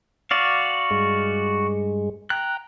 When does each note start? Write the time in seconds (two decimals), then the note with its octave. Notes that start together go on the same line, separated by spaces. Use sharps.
0.31 F#4 D5 F5
0.91 G2 G#3
2.30 G5 A#5 F#6